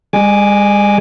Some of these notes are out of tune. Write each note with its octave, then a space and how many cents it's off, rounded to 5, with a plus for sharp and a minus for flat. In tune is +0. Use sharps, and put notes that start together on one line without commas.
G#3 -45 G#5 +0 D6 +0